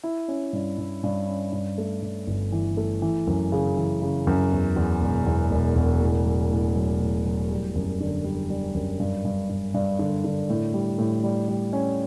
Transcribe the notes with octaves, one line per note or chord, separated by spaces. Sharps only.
E4
C#4
G2
G2
G2
C#4
G2
A3
G2
G1
E3
A3
E3
F#2
C#3
E3
C#3
F#2
E2
E2
E1
E2
E1
E1
A2
F#3
A2
F#3
A2
F#3
G3
F#2
D3
G3
G3
F#2
G2
G2
G2
G2
D3
D3
A2
G3
A2
G3
G3
C#4